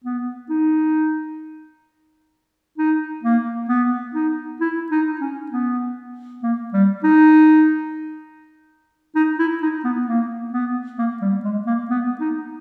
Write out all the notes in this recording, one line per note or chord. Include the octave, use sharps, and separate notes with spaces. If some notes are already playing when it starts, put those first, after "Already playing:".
B3
D#4
D#4
A#3
B3
D#4
E4
D#4
C#4
B3
A#3
G3
D#4
D#4
E4
D#4
B3
A#3
B3
A#3
G3
G#3
A#3
B3
D#4